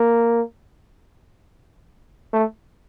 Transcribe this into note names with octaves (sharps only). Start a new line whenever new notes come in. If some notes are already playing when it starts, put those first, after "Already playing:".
Already playing: A#3
A3